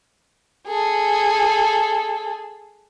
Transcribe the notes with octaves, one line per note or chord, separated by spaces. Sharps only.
G#4 A4